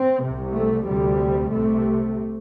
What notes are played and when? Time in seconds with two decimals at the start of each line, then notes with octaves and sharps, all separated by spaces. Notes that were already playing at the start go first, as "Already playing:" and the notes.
Already playing: C4
0.24 C2 C3
0.55 A3
0.87 D2 C3 G3
1.51 C2 C3 A3